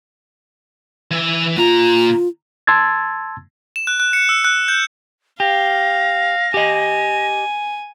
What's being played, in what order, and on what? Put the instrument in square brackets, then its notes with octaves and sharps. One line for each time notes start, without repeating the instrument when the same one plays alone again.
[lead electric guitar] E3 E5
[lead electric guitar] A#2 A#5 [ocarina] F4
[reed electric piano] A5 C6 E6 G#6 A6
[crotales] E7
F#6
F#6
C#7
E6
F#6
G6
[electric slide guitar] G4 [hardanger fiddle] F5 [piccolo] A#6
[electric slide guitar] G4 D#5 [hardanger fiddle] G#5